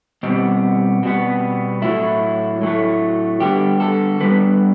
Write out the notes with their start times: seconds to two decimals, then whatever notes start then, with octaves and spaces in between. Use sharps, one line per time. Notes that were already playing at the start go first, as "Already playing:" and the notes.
0.23 B2 G3 B3 C4
1.03 B2 G3 B3
1.82 A2 F#3 A3 E4
2.62 A2 F#3 A3
3.40 D3 G3 B3 G4
3.80 A4
4.20 D3 G3 B3 B4